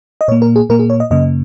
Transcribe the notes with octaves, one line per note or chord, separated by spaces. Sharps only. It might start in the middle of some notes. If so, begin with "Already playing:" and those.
D#5
A#2 A#3 C#5
A#4
G#4
A#2 A#3 A#4
G#4
C#5
D#5
F#2 C#3 A#3 D#5